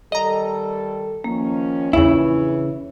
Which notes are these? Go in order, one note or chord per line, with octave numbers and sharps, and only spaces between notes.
D#3 G3 A4 D#5 A#5
D#3 F3 A#3 C#4
A#1 E2 C#3 E3 E4 C#5